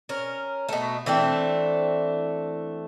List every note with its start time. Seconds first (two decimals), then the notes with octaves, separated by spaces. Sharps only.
0.09 C#4 A#4
0.69 B2 A3
1.06 E3 A3 C4 D4